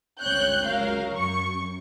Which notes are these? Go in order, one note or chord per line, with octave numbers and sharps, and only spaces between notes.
G1 C#2 C4 C#5 F#6 G6
C#2 F#3 A#4 F5
F#2 C#6